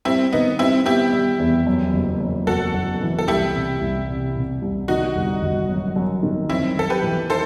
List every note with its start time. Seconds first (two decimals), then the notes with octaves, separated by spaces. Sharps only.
0.05 G3 C4 E4
0.32 D#3 B3 D#4
0.59 G3 C4 E4
0.86 B3 E4 G4
1.13 G3
1.40 E2
1.67 F#2
1.94 F#1
2.21 F#2
2.47 F#1 F#4 A4
2.74 F#1
3.01 E3
3.19 A4
3.27 C2 E4 G4
3.55 C3
3.81 C2
4.08 C3
4.35 C3
4.62 C2
4.88 D#3 D#4 F#4
5.16 G1
5.43 G1
5.69 F#2
5.96 F#2
6.23 D#3
6.50 F#2 C4 E4
6.77 F#2 A4
6.90 G4 B4
7.03 E3
7.30 D#4 A4 C5